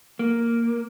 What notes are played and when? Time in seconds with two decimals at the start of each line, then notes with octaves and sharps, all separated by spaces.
0.19 A#3